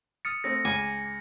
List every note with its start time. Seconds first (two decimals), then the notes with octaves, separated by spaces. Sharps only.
0.25 D#6 F6 A6 C#7
0.44 A3 C4 A#6
0.65 C#2 G#5 D6